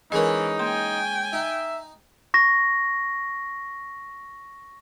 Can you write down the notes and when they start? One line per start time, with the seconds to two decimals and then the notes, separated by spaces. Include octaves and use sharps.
0.12 E3 G#3 C#4 D#4 A#4 B4 D#5
0.59 A#3 G5 G#5 C6
1.33 D#4 E5
2.34 C#6 A#6